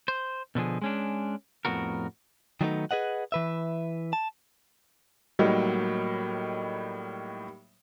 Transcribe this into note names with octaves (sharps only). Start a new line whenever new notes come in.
C5
B2 D3 F3 G#4
G#3 C#4 D4
F2 A2 B3 F#4 A#4
D#3 F#3 G3 A3 B3 D#4
G#4 B4 D#5 F#5
E3 B4 E5
A5
A2 F#3 G3 A#3 D#4